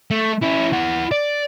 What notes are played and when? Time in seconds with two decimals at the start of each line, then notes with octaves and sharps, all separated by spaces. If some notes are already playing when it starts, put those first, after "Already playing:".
0.11 A3
0.43 C#4 E4
0.73 E4 F#5
1.12 D5